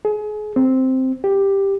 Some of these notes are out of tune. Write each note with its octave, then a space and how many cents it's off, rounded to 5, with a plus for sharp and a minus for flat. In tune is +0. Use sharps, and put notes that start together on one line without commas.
G#4 +30
C4 -5
G4 +5